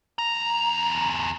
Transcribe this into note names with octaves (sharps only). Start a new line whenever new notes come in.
E2 A#5